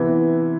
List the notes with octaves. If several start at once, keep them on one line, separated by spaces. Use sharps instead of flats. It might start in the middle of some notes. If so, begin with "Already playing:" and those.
Already playing: C3 E3 B3 E4